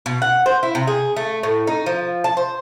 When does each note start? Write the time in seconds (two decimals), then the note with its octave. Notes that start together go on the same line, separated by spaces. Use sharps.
0.06 B2
0.22 F#5
0.46 C5
0.63 E4
0.75 C3
0.87 G#4
1.17 A3
1.43 A2
1.67 D#4
1.86 F3
2.24 A5
2.37 C5